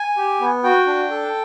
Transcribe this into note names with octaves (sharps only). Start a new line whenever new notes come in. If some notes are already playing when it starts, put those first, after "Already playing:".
Already playing: G#5
G4
B3
F#4 G5
D4
A4